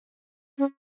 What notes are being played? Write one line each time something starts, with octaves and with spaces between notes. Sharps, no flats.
C#4